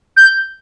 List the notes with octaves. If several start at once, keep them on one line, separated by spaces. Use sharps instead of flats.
G6